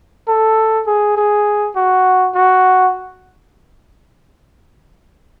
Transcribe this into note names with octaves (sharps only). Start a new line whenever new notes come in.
A4
G#4
G#4
F#4
F#4